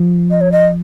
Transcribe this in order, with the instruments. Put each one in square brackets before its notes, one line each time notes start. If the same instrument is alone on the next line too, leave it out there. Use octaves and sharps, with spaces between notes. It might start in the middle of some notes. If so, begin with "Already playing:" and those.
Already playing: [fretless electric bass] F3
[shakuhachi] D#5
C#5
D#5